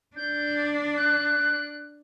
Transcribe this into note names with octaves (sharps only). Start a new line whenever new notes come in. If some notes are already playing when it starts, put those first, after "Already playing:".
D4 G6
F#6